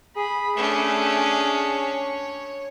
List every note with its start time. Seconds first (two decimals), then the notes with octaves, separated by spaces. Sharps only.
0.17 G#4 B5
0.57 A3 C#4 D4
1.73 C#5